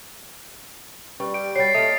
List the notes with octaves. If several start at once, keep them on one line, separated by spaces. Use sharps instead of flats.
G3 C#4 B4 C#6
G4 D7
G3 F#4 C#5 A6 C7
A3 A#3 A#4 D#5 D#6